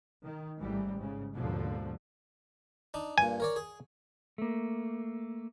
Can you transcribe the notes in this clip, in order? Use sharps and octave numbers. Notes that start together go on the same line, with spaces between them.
D#3
A1 G#2 E3 G3
G#2 C#3
D#2 G#2 B2 D3 F3
D4 D#4
G2 A#2 G#5
A#4 C#5 D5
G#4
A3 A#3